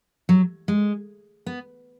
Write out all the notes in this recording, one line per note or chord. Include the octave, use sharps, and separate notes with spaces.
F#3
G#3
B3